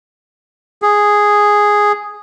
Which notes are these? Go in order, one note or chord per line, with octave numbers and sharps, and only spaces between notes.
G#4